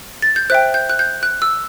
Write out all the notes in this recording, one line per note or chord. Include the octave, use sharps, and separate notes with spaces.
A6
G6
C5 E5 G5 F#6
G6
F#6
G6
F#6
E6